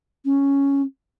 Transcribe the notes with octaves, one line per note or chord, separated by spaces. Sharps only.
C#4